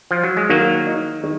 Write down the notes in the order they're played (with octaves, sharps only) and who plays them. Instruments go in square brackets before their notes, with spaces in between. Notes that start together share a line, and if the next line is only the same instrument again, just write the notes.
[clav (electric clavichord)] F3
F#3
G#3
[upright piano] D#3 [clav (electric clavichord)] F#3 A#3
[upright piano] D#4
D#3